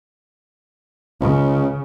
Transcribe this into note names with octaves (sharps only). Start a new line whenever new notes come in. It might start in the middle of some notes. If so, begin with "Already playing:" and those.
C#2 C#3